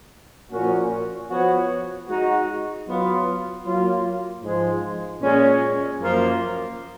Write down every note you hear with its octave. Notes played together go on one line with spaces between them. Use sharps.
A#2 F3 A#3 C#4 F#4
F3 B3 F#4 C#5
G#3 D#4 F#4
F#3 B3 F4
F#3 A#3 F4
G#2 F3 G#3
A#2 G#3 C#4
F#2 F3 A#3 F4